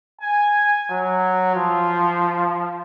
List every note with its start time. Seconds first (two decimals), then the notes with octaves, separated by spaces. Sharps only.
0.21 G#5
0.91 F#3
1.55 F3